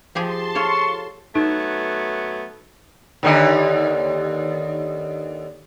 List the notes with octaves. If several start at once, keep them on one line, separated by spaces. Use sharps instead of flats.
F3 G4 G#4 A5 C6
F4 A4 C#5 C#6
F#3 A3 B3 D#4
D#2 D3 D#4